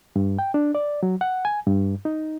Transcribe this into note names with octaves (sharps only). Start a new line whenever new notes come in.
G2
G5
D4
D5
F#3
F#5
G#5
G2
D#4